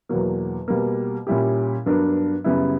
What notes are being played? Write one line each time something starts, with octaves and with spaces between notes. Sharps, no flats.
E2 B2 F#3 A#3
B2 G3 A#3
A#2 G3 C#4 E4 G4
G2 F#3 B3 D4 A#4
F#2 C#3 G3 B3 E4